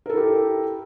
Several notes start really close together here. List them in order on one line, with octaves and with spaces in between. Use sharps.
A#4 A4 E4 G4